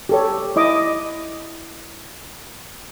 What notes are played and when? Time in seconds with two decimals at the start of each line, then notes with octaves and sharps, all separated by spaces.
0.09 G4 A4 C#5
0.56 E4 D#5 D6